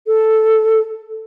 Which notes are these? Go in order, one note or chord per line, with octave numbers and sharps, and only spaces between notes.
A4